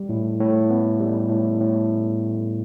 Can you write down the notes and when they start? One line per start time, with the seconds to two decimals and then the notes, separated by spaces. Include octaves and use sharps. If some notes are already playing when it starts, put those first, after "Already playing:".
Already playing: G3
0.09 A2
0.40 A2
0.70 B3
1.00 G3
1.30 A2
1.60 A2